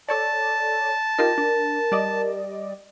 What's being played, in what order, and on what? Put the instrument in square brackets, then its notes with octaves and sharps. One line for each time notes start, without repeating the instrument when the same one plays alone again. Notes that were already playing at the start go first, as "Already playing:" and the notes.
[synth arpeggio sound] A4 C#5 D5 [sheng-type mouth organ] A5
[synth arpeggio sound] D#4 F4 G4 [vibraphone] A#4
[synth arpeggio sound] D4
G3 D5 D#5